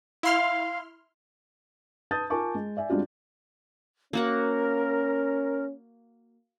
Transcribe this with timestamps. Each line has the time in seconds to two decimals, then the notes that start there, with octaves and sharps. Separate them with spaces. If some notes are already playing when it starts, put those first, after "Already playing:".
0.23 E4 F5 C6 F6
2.11 B4 A5 D#6 G6 A6
2.30 F4 A#4 G#5 A5 C#6 D6
2.55 G#3
2.77 D5 E5 G#5
2.90 G3 G#3 C4 D4 F4 F#4
4.13 A#3 C#4 F#4 A#4 F#5